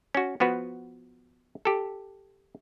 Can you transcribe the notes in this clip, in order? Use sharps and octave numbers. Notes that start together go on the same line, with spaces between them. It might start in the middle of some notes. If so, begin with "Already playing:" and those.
C#4 F#4
F3 B3 F#4 B4
G4 A4